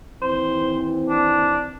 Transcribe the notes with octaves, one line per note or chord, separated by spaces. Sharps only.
D#2 E3 C4 C5
D4